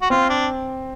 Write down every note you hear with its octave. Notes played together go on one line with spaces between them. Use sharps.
F#4
C4 F4
D4